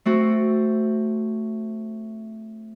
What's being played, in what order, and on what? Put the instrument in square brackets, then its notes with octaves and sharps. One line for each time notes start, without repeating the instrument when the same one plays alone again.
[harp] A3 C4 F#4